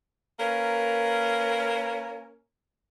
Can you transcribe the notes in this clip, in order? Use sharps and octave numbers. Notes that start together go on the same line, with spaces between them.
A#3 C#4 A#4 B4